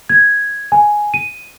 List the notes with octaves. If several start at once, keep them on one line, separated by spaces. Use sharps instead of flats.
G#6
G#5
D#7